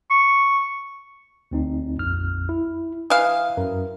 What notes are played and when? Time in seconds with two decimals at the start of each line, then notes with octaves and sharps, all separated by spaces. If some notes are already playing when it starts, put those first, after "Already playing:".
0.11 C#6
1.51 D2 C4 D#4
1.98 A#1 F2 F6
2.49 E4
3.10 E3 F5 G#5 D#6
3.57 F#2 A#4